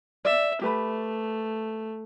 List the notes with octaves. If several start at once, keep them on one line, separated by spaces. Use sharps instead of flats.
D5 E5
A3 G4 B4 B5